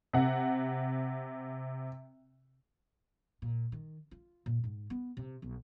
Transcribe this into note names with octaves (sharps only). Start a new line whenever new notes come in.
C3 F#5
A#2
D#3
F4
A#2
G#2
B3
C3
B1